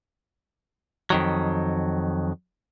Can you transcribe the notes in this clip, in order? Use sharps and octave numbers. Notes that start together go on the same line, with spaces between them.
F2 D#3 F#3